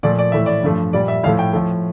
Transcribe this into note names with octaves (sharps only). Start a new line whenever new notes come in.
A#2 F3 A3 D5
D5
A2 E3 A3 E5
D5
G2 F3 A3
A#2 G3 D5
E5
A2 F3 A3 F5
G5
A2 F3 A3